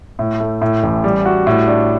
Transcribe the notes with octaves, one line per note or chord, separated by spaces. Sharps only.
A2
A3
A2
A1
G3
F#4
A2
D4